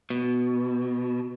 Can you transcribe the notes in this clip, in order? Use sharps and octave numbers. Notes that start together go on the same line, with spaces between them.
B2